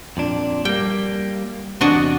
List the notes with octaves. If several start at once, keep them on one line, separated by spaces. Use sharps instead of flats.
F2 A#2 D4
G3 A#3 G5
E2 G2 C3 D4 F#4 D#5